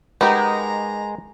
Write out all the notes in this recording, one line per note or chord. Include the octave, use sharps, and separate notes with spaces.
G#3 D#4 G4 A#4 B4 F#5 A#5